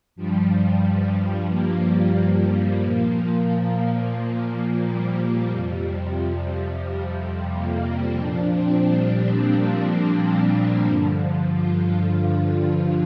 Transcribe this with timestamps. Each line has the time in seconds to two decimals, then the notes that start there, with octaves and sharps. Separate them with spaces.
0.16 G2 F3 G3
1.50 A#3
2.83 A#2 F3 A#3
4.84 G3
5.51 F2 C3 F3
6.18 G3
7.51 A#3
7.85 C4
8.18 A#2 F3 D4
8.52 C4
8.85 G3
9.52 A#3
9.85 C4
10.86 G2 D3 F3
11.53 F4